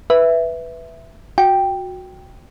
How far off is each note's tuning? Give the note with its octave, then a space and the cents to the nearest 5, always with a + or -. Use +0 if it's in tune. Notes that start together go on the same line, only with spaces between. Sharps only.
B4 +0 E5 +0
F#4 -15 G5 +0